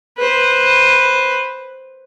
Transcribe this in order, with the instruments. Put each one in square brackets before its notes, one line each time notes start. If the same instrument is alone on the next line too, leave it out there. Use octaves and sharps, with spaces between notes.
[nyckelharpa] B4 C5